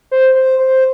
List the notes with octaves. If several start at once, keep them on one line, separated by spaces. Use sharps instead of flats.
C5
C5
C5